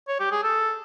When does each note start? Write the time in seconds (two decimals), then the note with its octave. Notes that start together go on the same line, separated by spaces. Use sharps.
0.08 C#5
0.20 G4
0.31 G#4
0.43 A4